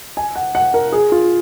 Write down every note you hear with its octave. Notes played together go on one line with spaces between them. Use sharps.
G#5
F#5
F#5
A#4
G#4
F4